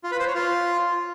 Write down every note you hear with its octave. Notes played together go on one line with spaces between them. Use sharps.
F4
B4
C5
C#5
F4